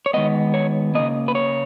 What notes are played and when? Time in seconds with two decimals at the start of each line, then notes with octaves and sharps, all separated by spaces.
0.06 C#5
0.14 D#3 G#3 B3 D#5
0.54 C#5
0.95 C#3 E3 A#3 D#5
1.28 B4
1.35 C#5